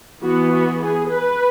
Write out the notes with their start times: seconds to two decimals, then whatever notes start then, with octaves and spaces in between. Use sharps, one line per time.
0.22 E3 B3 F#4
0.52 F#4
0.81 G#4
1.11 B4